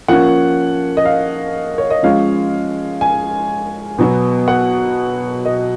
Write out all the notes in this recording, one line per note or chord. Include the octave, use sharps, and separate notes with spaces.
F3 A#3 C#4 F#5
D#5
F5
C#5
D#5
F3 G#3 C#4 F5
G#5
B2 F#3 B3
F#5
D#5